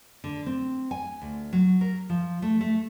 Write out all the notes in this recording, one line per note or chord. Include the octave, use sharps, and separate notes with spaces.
D3
C4
G#5
D2
F#3
A#4
F3
A3
A3